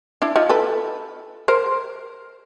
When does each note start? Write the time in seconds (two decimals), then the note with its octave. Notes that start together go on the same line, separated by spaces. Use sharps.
0.22 D4 E4
0.36 D#4 F4
0.49 A4 B4
1.48 A#4 C5